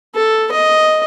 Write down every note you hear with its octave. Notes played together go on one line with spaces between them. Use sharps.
A4
D#5